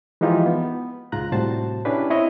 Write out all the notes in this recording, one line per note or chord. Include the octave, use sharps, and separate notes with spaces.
E3 F3 G#3 D#4 F4 G4
B3
C#2 G#2 F4 A#5 F#6
A2 C3 G3 F#4 C5 A5
C#4 D4 E4 G4 B4
C4 E4 C#5 D#5